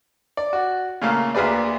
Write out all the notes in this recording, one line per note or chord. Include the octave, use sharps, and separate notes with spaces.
D5
F#4
A#2 C#3 A3 A#3
D2 A#3 G#4 B4 D5